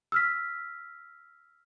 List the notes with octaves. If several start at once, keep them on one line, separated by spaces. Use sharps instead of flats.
E6 F6 B6